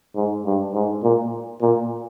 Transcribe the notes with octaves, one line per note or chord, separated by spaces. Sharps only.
G#2
G2
G#2
A#2
A#2